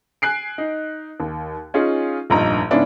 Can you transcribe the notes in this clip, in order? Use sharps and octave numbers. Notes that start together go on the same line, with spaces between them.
G#5 F#6 C7 D7
D#4
D#2
C#4 D#4 F4 G#4
F1 A#1 G2 D#4 A#5
G#2 C#3 B3 C#4 D4 E4